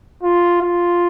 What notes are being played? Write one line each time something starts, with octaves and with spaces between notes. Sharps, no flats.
F4
F4